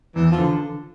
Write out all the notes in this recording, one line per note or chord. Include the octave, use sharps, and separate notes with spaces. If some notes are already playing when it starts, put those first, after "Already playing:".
E2 E3
F3
D3